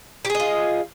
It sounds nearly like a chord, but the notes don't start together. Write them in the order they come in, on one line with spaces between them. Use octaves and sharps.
G4 G#4 D#5 F4